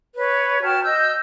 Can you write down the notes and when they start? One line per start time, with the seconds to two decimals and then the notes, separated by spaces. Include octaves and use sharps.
0.16 B4 C#5
0.63 F#4 G5 A5 F6
0.83 D#5 E6 G6